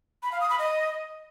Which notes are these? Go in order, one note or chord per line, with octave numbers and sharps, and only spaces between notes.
B5
F5
D#6
B5
D#5